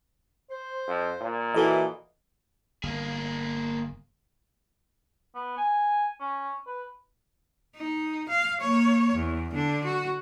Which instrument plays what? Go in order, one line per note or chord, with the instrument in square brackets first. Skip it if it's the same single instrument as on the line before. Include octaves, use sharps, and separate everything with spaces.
[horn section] C5
[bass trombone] F2
A#2
[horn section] E3 [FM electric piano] F#4 A4 D#5
[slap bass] G1 [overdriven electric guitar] A#3 G#4
[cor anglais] B3
G#5
C#4
B4
[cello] D#4
F5
A#3 C#5
E2
D3 D4
F#4